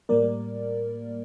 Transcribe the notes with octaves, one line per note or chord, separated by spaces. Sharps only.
A2 G3 A#3 A#4 D5